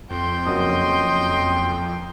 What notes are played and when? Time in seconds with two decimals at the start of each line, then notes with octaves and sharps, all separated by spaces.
0.10 F2 G5 C6
0.47 F#1 C#4 F#4 D#5